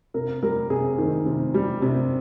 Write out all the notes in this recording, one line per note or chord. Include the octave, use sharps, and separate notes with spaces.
C3 A#4
G3 A#4
C3 G#4
D#3
C3
G3
C3